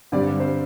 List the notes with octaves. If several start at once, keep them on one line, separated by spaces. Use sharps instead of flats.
G2 D3 G3 C4 D5
C5